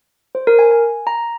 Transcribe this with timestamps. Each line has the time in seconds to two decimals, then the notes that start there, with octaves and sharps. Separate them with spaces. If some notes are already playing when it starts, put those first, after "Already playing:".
0.35 C5
0.47 A#4
0.59 G#5
0.71 G#5
1.07 A#5